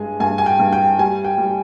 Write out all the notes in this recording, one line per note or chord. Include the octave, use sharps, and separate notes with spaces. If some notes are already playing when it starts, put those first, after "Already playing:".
Already playing: G2 G#3 G#5
G2 G#5
G#5
G5
G2
G5
G3 G#5
G5
G3